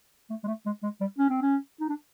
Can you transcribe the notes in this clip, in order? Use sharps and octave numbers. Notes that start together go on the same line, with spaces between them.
A3
G#3
A3
G#3
G#3
G3
C#4
C4
C#4
D#4
D4